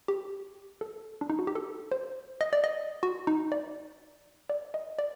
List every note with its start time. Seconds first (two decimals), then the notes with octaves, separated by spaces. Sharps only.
0.08 G4
0.81 A4
1.21 D4
1.30 D#4
1.39 F#4
1.47 G4
1.55 A4
1.92 C5
2.41 D#5
2.53 D5
2.64 D#5
3.03 F#4
3.27 D#4
3.52 D5
4.50 D5
4.74 D#5
4.99 D5